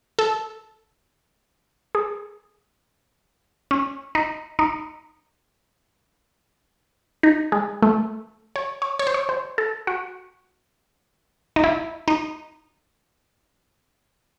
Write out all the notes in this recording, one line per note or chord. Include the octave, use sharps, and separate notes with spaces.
A4
G#4
C#4
D#4
D#4
D#4
G#3
A3
C#5
C#5
C#5
C5
C#5
C5
A4
F#4
D#4
E4
D#4